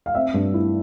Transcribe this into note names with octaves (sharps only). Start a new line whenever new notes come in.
F5
C4 E5
G2
E4